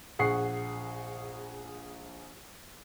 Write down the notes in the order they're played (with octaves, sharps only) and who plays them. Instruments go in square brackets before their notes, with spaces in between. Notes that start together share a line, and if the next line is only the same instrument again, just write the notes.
[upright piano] A#1 G#4 F#5 C#6 C7